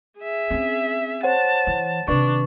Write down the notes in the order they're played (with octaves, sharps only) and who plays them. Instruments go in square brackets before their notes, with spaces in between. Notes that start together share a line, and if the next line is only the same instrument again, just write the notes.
[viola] G#4 E5
[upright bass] C4 C#4
[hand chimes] C5 C#5 F#5 [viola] A5
[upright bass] E3
[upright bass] C3 D#3 [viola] D4 [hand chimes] B4 D5 C#6